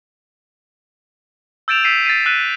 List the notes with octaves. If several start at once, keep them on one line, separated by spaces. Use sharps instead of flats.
E6 G6 A6 D7 E7 F7
E6 B6 C7 D#7
A6 B6 C7 D#7
E6 F#6 B6 D#7 E7